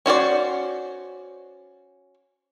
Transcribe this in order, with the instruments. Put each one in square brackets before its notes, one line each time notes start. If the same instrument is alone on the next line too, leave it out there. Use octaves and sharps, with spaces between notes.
[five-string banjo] C#4 F#4 C5 D5